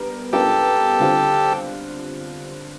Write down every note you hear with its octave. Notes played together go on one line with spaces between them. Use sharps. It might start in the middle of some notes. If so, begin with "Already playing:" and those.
Already playing: G3 B3 D4 A#4
G3 B3 D4 F4 G4 A4 A#4
D3 G3 C4 F4